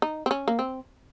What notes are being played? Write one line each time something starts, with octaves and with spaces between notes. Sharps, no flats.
D#4
C4
C#4
A#3
C4